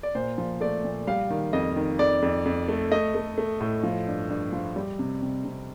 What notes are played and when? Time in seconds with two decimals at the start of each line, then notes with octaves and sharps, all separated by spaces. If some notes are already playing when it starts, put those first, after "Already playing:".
0.03 D5
0.15 A#2 C5
0.38 F3
0.61 A3 D5
0.84 A#2
1.07 G3 F5
1.30 D#3
1.53 F2 D#5
1.76 D#3
1.99 F2 D5
2.22 F2
2.45 F2
2.68 A3
2.92 A3 D#5
3.15 A3
3.38 A3
3.61 A2
3.83 F3
4.07 G2
4.29 G2
4.53 F3
4.76 G3
4.99 C3
5.22 C3
5.45 C3